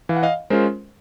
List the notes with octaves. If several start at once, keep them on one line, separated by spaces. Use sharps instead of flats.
E3 F5
F#5
D#5 F5
G#3 C#4 F4 A#4 C5